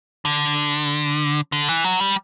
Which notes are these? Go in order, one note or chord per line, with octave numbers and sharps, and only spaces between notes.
D3
D3
E3
F#3
G3